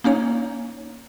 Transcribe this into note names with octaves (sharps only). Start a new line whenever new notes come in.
A#3 C#4 D#4 C#5